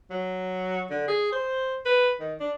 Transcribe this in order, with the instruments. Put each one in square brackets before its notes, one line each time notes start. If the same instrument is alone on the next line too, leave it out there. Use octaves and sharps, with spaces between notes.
[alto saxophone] F#3
D3
G#4
C5
B4
D#3
D4